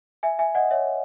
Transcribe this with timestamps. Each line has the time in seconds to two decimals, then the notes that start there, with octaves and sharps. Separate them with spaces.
0.23 E5 G#5
0.39 E5 G#5
0.55 D#5 F#5
0.71 C#5 E5